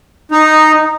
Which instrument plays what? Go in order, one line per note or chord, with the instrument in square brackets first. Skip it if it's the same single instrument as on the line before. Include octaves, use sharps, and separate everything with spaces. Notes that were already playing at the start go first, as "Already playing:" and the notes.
[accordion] D#4